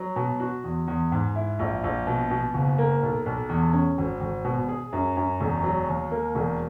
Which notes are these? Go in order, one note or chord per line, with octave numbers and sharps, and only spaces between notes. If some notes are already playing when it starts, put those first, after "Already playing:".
Already playing: F#3
B2
F#4
E2
E2
G#2
E4
A#1
A#1
B2
B2
F#1
A#3
B1
B1
E2
C#4
G#1
G#1
B2
G#4
F#2
F#2
E1
F#3
D#2
A#3
E1